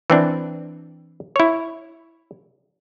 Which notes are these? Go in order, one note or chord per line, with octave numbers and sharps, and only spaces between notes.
E3 C4 D4
E4 C#5